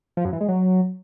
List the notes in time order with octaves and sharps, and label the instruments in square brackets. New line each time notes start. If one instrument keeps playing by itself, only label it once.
[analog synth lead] F3
F#2
E3
G#3
F#3